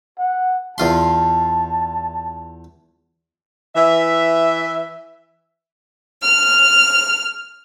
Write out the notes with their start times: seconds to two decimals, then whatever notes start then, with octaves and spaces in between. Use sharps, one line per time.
0.19 F#5
0.78 E2 F4 A5 C6
3.76 E3 E5
6.22 F6